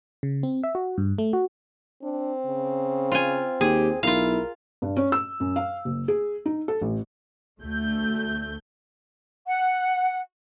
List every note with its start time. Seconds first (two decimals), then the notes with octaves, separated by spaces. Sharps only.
0.23 C#3
0.43 C4
0.64 E5
0.75 F#4
0.98 G2
1.18 A3
1.33 F#4
2.03 C4 D4
2.45 C#3
3.12 F4 G#5
3.61 D#2 G4 G#4
4.03 B1 E4 F4 A#4 F5
4.82 G2
4.97 C#4
5.12 E6
5.40 F#2
5.56 F5
5.85 F#1
6.08 G#4
6.46 D#4
6.68 A4
6.81 A1
7.60 D2 A3 G6
9.47 F#5